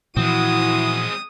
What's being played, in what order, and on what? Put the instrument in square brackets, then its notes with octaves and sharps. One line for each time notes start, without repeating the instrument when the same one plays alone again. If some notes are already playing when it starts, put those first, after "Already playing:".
[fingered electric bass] A#2 E3 F3 [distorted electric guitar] G#3 C4 [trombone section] E4 F#4 [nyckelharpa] D#6